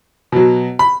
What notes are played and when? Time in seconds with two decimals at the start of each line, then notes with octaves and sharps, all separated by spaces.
0.32 B2 F#3
0.79 B5